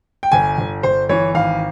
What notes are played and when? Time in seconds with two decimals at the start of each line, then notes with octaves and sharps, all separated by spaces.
0.23 G5
0.32 G1 G#5
0.58 G1
0.83 G1 C5
1.09 E3 C#5
1.35 G#1 F5